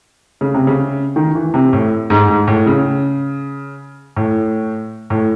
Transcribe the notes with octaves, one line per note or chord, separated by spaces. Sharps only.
C#3
C3
C#3
D#3
E3
C3
A2
G#2
G#2
A2
C#3
A2
A2